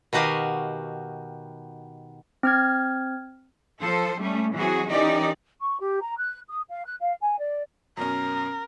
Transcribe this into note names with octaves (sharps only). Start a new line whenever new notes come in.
B2 D#3 F#4 G4 D#5 F5
C4 F6 G#6
F3 A4 C5
G3 A3 C#4
E3 F#3 C4 F#4 G#4
D#3 E3 C#4 D#4 G4 D5
C#6
G4
A#5
F#6
D#6
F5
F#6
F5
G#5
D5
F#2 B2 C#4 A#4